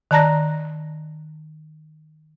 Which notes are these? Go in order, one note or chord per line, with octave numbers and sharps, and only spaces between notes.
D#3 D5 A5 A#5 F#6 A#6